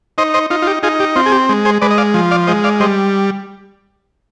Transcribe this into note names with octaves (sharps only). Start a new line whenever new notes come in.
D#4 C5 D#5
C5 D#5
D#4 F4
F4
G4
D#4 F4 G#4
G4
C4 F4
G#4
G4
G#3
G#4 C5
G#3 B4 D5
D#5
D5 F5
F3
D5 F5
G#3 C5 D#5
D5 F5
G3 C5 D#5